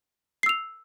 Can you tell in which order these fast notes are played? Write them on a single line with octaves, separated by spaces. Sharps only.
C7 E6 F7